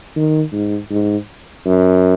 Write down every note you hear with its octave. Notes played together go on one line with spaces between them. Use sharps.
D#3
G#2
G#2
F#2